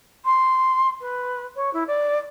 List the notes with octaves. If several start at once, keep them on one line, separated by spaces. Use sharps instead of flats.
C6
B4
C#5
E4
D5